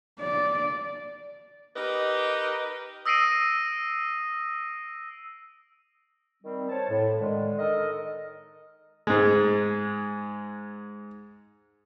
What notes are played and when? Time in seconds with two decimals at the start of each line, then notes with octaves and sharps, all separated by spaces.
0.20 D5
1.76 D#4 G4 A#4 B4 D#5
3.06 D#6 E6 A#6 C7 D7 D#7
6.42 D#3 G3 C4
6.69 C5 C#5 A5
6.89 A2
7.19 D3 D#3 G#3
7.58 D#4 A4 A#4 D#5
9.07 G#2 G#3